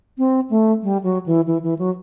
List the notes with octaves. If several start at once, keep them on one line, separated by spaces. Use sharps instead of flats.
C4
A3
G3
F#3
E3
E3
E3
F#3